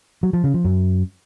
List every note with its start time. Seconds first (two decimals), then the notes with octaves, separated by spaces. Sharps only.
0.23 F#3
0.33 F3
0.44 C#3
0.54 F3
0.64 F#2